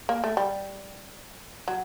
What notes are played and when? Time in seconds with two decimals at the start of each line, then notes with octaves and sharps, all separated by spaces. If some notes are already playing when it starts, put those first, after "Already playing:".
0.09 A#3
0.24 A3
0.37 G3
1.68 F#3